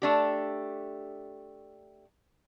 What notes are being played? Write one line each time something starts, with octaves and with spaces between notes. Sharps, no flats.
A3 D4 G4